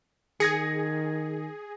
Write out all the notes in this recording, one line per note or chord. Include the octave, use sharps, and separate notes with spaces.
D#3 G#4 G#6 A#6 C#7